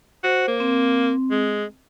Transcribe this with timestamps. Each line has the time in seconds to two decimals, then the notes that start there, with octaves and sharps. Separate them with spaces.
0.24 F#4 C5
0.48 A#3
0.60 C4
1.31 G#3